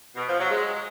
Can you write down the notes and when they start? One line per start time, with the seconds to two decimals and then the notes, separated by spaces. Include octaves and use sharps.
0.15 B2
0.27 F3
0.39 F#3
0.49 G#3